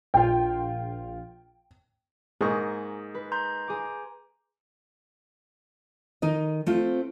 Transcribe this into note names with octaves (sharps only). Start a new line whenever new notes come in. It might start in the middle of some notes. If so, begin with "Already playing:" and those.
A#1 F4 G5
G#2 A#3 G#4 C#6 D#6
B4
A#5 C6 G6
G#4 D6
D#3 D#4 D#5
A3 C4 F4